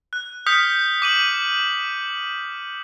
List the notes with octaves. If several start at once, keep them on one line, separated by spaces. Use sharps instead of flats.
F#6
D#6 F6 G6 B6 C#7
D6 D#7 F#7